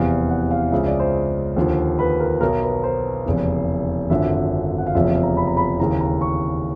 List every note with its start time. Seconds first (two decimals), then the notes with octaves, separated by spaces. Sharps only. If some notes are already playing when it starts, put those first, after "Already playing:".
Already playing: F1 E2 C3 E3 F5
0.30 F#5
0.51 F5
0.72 C#2 C#3 F3 E5
0.86 D5
1.00 C5
1.56 D#2 D3 F3
1.99 B4
2.20 A#4
2.41 B1 B2 A#4
2.62 B4
2.84 C5
3.26 F1 E2 C#3 E3
4.10 G#1 F#2 D3 F3 E5
4.78 F#5
4.87 F5
4.95 F1 E2 C#3 F3 E5
5.09 F5
5.23 A#5
5.37 B5
5.47 A#5
5.57 B5
5.79 D#2 C#3 E3 A#5
6.00 A#5
6.21 C#6